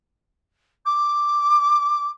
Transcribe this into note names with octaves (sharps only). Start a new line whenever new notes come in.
D6